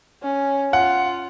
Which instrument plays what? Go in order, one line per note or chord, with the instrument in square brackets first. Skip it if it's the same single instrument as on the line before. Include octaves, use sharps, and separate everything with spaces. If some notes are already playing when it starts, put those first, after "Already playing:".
[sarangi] C#4
[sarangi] F4 [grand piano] F#5